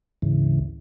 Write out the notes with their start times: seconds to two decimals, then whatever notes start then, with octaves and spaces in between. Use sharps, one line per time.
0.22 D2 G#2 C#3 E3